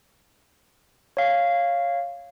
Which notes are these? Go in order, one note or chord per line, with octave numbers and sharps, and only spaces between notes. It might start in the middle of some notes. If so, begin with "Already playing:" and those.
C#5 F5